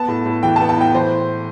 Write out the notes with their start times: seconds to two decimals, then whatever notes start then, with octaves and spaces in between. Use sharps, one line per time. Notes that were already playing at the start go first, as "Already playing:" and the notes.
Already playing: B3 A5
0.08 A2
0.26 A2
0.43 E3 G5
0.56 A5
0.60 B3
0.69 A5
0.77 A2 G5
0.94 E3 C5